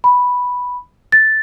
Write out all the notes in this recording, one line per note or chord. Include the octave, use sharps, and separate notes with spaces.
B5
A6